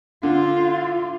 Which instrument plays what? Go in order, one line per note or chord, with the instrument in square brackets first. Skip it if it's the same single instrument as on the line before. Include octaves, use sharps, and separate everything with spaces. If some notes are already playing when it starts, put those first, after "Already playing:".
[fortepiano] D3 [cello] F4